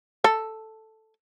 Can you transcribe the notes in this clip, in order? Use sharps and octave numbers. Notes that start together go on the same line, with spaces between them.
A4